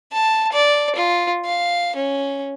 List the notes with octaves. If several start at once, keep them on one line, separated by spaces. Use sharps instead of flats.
A5
D5
F4
F5
C#4